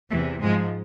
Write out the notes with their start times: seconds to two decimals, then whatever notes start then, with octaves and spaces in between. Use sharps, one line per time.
0.11 E2 C3 E3 A3
0.40 G#2 F3 G#3